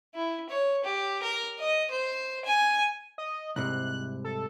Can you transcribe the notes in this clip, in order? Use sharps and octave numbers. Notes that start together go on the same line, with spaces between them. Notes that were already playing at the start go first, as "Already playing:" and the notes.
E4
C#5
G4
A#4
D#5
C5
G#5
D#5
C2 G#2 C3 F#6
A4